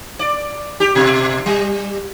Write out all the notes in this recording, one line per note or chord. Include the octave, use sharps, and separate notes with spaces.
D5
G4
B2
G3